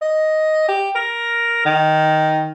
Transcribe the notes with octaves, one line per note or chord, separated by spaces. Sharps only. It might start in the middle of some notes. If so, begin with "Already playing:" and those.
D#5
G4
A#4
D#3